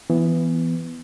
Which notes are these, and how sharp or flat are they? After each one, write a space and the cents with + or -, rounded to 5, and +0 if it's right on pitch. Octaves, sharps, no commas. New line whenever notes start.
E3 +15 B3 +10